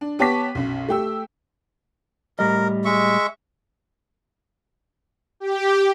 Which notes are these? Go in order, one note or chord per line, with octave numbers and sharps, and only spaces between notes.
D4
B3 G4 C#5 A5 D6 B6
B1 F#2
A3 G4 E6
A2 G3 A#4 D#5
G#3 E5 C#6
G4